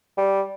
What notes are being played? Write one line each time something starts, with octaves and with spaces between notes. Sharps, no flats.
G3